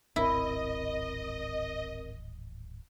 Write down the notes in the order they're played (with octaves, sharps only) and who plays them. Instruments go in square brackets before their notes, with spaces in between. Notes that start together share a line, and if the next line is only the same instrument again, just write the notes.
[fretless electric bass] D1 G#1 [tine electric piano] C4 A#4 [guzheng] E4 [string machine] D#5